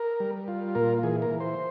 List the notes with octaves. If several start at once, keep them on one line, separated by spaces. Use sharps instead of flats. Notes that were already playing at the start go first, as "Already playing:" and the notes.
Already playing: A#4
G3
F4
A#2 A#4
E3 G#4
A#4
E3
C5